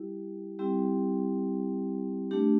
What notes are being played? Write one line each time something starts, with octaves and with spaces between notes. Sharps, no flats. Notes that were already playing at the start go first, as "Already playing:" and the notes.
Already playing: G3 E4 G4
G3 C4 E4 G4
A3 D4 G4